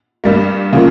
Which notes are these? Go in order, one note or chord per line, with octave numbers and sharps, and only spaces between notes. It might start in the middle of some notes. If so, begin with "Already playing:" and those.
G2 G3 A#3
C#3 F3 A#3